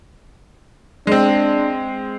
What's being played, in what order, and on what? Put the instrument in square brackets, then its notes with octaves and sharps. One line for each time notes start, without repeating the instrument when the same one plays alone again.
[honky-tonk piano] G#3 C4 [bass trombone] D4